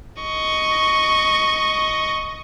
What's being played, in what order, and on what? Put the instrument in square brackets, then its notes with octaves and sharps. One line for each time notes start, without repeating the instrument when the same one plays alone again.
[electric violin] D#5 C#6